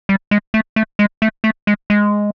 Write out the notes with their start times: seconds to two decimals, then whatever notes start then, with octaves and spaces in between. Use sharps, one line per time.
0.09 G3
0.31 G#3
0.54 A3
0.76 A3
0.99 G#3
1.22 A3
1.44 A3
1.67 G#3
1.90 G#3